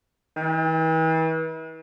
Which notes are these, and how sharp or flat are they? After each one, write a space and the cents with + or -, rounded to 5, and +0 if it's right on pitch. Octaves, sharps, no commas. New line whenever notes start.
E3 -40